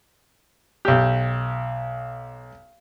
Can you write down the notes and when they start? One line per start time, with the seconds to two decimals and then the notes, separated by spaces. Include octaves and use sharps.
0.85 B1 G4